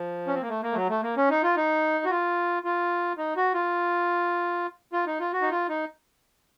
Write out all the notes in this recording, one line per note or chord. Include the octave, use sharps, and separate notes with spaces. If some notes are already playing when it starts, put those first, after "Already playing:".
Already playing: F3
C#4
C4
A#3
A3
A#3
A3
F#3
A3
A#3
C#4
D#4
F4
D#4
F#4
F4
F4
D#4
F#4
F4
F4
D#4
F4
F#4
D#4
F4
D#4